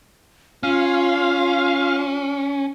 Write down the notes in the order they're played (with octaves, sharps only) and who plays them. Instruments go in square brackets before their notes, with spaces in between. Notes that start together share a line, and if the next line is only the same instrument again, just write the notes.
[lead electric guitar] C#4 [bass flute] F4 [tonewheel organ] F5